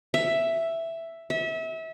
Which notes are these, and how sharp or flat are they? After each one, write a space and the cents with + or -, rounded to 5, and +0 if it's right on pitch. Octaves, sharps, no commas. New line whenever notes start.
E5 +5
E5 -30